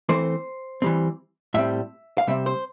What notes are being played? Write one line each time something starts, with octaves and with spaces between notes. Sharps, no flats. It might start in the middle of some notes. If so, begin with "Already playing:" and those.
E3 A3 C4 C5
E3 G3 C4
A2 G3 C4 E5
F5
C3 G3 C4 E5
C5